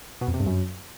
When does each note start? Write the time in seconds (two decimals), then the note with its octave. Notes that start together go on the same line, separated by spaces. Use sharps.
0.21 B2
0.28 F2
0.34 C3
0.40 G2
0.46 F#2